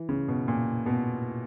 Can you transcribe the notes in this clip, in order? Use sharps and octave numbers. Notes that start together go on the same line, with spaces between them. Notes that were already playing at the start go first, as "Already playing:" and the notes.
Already playing: E3
C#3
B2
A#2
B2